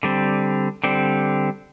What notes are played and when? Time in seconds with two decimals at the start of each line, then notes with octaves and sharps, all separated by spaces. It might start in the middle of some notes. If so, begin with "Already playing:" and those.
0.03 D3 G3 C4
0.84 D3 G3 C4